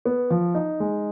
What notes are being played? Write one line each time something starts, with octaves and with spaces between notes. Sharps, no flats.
B3
F3
D#4
G#3